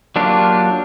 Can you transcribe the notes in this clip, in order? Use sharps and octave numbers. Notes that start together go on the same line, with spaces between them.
F#3 A#3 D4 F4 G4